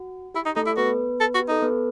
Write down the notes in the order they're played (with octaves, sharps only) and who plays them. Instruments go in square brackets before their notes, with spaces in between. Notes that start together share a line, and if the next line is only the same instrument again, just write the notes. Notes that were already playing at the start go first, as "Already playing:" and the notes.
Already playing: [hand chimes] F#4
[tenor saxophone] E4 [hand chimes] G4
[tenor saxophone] D#4
[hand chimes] A3 A4 [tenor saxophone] D#4
[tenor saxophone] E4
[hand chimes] B3 B4 [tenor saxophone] F#4
[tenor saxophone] A4
F#4
[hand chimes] G4
[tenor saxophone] D#4 [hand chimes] A4
[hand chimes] B3 B4